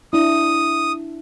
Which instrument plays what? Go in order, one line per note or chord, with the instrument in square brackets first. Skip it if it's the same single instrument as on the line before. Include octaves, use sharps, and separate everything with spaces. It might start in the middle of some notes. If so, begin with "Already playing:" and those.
[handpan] D4 E4 [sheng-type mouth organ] D#6